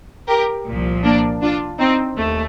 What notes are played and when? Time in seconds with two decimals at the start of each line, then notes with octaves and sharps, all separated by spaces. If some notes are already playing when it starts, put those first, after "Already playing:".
0.28 G4 A#4
0.67 C2 A#2 F3
1.04 A#3 D4
1.41 D4 F4
1.79 C4 D#4
2.17 D#2 A3